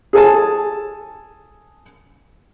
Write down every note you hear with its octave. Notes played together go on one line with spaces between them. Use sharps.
G#4 A4 G#5 A5